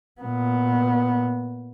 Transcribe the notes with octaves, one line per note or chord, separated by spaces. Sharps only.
A#2 B3